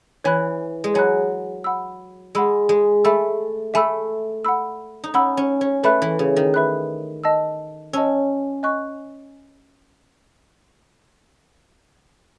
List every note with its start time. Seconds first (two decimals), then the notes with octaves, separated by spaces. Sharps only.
0.24 E3 C#5 G#5 B5 F#6
0.84 G#3
0.94 F#3 C#5 G#5 B5 F#6
1.64 F#5 B5 E6
2.35 G#3 F#5 B5 E6
2.69 G#3
3.04 A3 E5 G#5 B5 E6
3.74 A3 E5 G#5 B5 E6
4.45 F#5 B5 E6
5.04 D#4
5.14 C#4 F#5 B5 E6
5.37 C#4
5.61 C#4
5.83 A3 B4 E5 B5 F#6
6.02 E3
6.19 C#3
6.36 D#3
6.54 B4 E5 B5 F#6
7.24 D#5 A5 E6
7.93 C#4 D#5 A5 E6
8.63 D#5 G#5 C#6 F#6